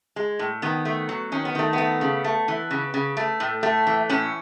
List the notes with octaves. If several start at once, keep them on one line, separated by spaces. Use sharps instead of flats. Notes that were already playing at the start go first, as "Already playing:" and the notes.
G#3
A2
D#3 B3
A3
F#3
D#3 C#4
B3
D#3 A3
B3
A3
C#3
A3
E3
C#3
C#3
A3
A2
A3
E3
A2 C#4